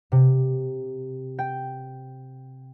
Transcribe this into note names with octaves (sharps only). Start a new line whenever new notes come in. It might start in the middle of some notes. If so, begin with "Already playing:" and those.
C3
G5